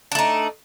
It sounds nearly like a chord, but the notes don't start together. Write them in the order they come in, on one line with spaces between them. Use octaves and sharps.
D4 A3 D#4